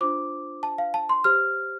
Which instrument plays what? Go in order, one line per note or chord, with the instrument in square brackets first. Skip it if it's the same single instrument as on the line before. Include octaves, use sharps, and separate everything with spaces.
[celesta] D4 F4 C5 D6
A5
F5
A5
C6
G4 C5 F6